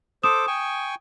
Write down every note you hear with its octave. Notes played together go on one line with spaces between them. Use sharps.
A4 C5 D6 D#6 E7
G5 G#5 C#6